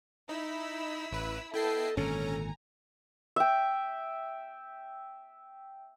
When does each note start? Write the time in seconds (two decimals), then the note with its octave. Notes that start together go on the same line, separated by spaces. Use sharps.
0.29 D#4 E4 B5 E6
1.12 A1 B4
1.54 B3 E4 A4 D#5 G5 A5 C7
1.97 G#1 A#2 D3 C#4 A4 G#5 A#5
3.36 E5 G5